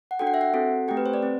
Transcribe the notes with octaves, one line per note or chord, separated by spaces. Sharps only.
F#5
D4 F#4 A4 G5
F#5
E5
F#5
C4 F#4 A4
A3 C4 G4 G5
B4
C5
D5
C4